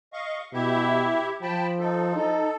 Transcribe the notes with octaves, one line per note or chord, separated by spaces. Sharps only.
D#5 F5 C#6
B2 E4 G4 E5
F3 G5 A5 B5
D#4 A4
D#4 A4